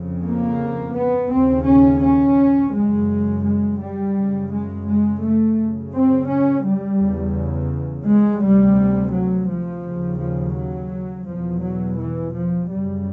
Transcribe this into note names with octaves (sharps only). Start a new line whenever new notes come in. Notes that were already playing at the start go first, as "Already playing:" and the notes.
Already playing: F2 C#3
A#3
B3
D#2 C#3 C4
C#4
C#4
F#2 C#3 G#3
G#3
G3
F#2 C#3
G#3
G#3
A3
F#2 C#3
C4
C#4
G3
E2 C#3
G#3
D2 C3 G3
F#3
F3
D#2 C#3
F3
F#3
E2 B2 F3
F#3
E3
F3
F#2 C#3 G3